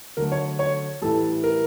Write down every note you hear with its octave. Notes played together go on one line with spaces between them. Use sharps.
D3 F#3 A3 A#4
C#5
C#5
A2 E3 G3 A4
A#4